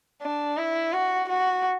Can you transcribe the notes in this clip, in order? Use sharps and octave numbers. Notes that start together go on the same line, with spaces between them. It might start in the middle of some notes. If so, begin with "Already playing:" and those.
D4
E4
F#4
F#4